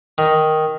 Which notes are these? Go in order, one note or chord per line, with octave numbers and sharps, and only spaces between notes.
D#3